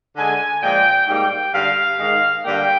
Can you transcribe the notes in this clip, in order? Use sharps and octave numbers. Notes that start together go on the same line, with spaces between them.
D3 G#3 G#5
A#2 F3 G#3 G5
G#2 G3 A#3 G5
G2 D3 G3 F5
G#2 D#3 G#3
G2 D3 G3 A#3 G5